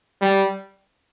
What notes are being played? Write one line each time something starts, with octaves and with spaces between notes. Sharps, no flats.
G3